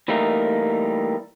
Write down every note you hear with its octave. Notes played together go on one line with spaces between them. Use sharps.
E3 G3 A3 A#3 D#4 A#4